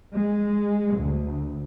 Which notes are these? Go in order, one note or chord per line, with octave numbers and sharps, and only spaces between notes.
G#3
D2